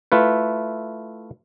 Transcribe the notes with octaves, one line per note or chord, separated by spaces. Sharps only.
A3 E4 F4 B4